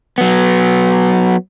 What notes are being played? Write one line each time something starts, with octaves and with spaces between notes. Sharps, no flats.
F#3 B3